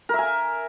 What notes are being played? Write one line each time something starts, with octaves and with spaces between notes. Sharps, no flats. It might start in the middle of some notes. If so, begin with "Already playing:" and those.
A#4 E5 G#5